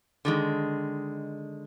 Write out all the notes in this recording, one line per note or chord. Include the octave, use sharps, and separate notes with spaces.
D3 D#3 G#3